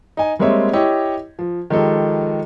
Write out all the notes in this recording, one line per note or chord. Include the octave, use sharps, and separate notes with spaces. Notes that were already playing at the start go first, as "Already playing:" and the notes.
D#4 G#5
G3 G#3 A#3 C4 C#5 E5
E4 G4 C#5 D#5
F3
D#3 F3 G#3 G4 A4